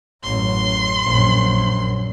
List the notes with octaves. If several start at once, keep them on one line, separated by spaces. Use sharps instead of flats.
A1 F#2 C6
A#1 F#2